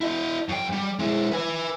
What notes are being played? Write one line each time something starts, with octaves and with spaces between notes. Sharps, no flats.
E4 D#5
F#2 G5
G3
G#3 E4
B4 G#5